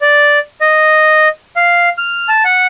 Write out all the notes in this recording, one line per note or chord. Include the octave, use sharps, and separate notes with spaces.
D5
D#5
F5
F6
A5
F#5